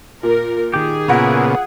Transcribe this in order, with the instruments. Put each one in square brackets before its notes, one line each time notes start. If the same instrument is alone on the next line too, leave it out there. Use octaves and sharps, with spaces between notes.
[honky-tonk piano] A#2 [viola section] A#4
[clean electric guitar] D#3 G4 [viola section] G#4
[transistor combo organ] A#2 C#3 B3 [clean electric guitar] E4 A#4 C#5 [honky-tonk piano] F4 F#5